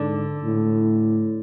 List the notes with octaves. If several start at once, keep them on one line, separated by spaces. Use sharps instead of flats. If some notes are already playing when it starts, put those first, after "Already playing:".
Already playing: G#2 D3
A2